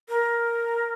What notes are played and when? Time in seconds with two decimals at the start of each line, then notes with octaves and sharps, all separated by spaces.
0.09 A#4